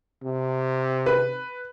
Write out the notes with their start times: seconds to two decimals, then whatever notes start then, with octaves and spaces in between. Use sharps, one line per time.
0.23 C3
1.06 B4